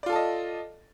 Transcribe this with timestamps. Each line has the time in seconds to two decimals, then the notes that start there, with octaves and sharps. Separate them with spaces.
0.03 D5
0.06 F4
0.09 A4
0.12 A5
0.16 D#5